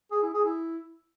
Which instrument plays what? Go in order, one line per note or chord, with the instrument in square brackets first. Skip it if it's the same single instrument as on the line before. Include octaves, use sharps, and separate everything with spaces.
[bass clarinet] G#4
E4
G#4
E4